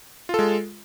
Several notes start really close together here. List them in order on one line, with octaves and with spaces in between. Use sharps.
F4 A4 G#3